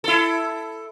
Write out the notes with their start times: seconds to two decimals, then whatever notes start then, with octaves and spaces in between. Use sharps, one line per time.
0.04 E4 A4